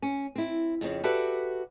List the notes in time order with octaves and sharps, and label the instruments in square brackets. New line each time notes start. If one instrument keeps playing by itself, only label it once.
[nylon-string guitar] C#4
C4 E4
F2 C#3 C4
F#4 G4 A4 B4 D5 E5